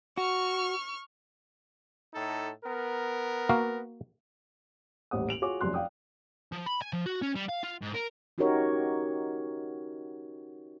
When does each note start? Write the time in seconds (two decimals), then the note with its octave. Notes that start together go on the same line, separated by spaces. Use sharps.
0.17 F#4 C#6 F6
2.14 A2 D#4 A4
2.65 B3 A#4
3.49 A#3 F#4 F5
5.11 D#1 A1 G3 C5 F#5 D#6
5.29 D7 F7 F#7
5.42 F4 F#4 G#4 C#5 C#6 D6
5.61 F1 F#2 F3 C6 F#6
5.74 D5 F5 G5 D#6
6.52 F3
6.66 B5
6.82 G#5
6.93 F3
7.06 F#4
7.22 C#4
7.35 G3
7.49 F5
7.63 F4
7.82 G#2
7.94 A#4
8.38 C#4 D#4 F#4 G4 A#4 C#5